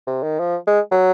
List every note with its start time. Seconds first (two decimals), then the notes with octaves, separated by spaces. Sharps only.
0.07 C3
0.23 D#3
0.39 F3
0.67 G#3
0.91 F#3